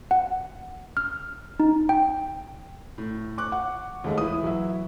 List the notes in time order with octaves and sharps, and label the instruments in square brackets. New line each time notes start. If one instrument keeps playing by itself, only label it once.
[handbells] F#5
F6
D#4
G5
[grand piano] A2
C#6 D6 F#6
[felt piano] F#5
[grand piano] D#2 G#3 A3
[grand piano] E3 E4 [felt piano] D#6
[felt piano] F#3 E5